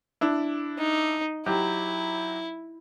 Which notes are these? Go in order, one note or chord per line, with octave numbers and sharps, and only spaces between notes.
D4 E4
D#4
F#3 E4 G4